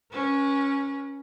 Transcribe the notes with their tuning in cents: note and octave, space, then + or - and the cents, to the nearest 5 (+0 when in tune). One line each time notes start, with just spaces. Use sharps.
C#4 +0 B4 -40